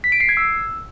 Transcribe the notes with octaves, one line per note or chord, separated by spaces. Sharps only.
B6
D7
C7
G#6
E6